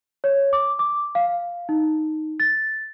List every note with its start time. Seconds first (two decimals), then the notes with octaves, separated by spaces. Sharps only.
0.24 C#5
0.53 D6
0.79 D6
1.15 F5
1.69 D#4
2.40 A6